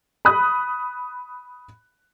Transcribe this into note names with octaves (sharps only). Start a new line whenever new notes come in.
B5 D#6 F#6